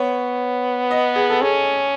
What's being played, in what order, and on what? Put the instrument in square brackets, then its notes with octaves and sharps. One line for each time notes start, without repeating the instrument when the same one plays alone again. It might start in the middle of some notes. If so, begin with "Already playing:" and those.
Already playing: [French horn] B3 [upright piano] C#5
[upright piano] D#5
G#4
A4
[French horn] C#4 [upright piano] G#4